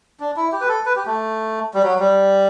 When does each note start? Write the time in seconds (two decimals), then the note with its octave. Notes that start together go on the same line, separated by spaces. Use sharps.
0.20 D4
0.37 E4
0.52 G4
0.61 B4
0.68 A4
0.86 B4
0.96 G4
1.06 A3
1.74 G3
1.83 F#3
2.00 G3